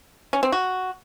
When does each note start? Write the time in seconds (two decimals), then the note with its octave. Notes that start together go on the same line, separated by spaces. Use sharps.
0.33 C#4
0.43 C4
0.52 F#4